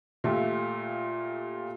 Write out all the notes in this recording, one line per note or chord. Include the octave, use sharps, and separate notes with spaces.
A#2 A3 F4 G4